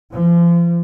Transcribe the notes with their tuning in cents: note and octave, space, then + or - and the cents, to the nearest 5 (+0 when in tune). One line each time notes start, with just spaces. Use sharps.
F3 -35